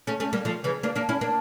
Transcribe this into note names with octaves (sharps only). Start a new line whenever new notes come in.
A3 C#4
A3 C#4
G3 A#3
F3 A3
C#3 E3
A#3 D4
A#3 D4
C#4 E4
A#3 D4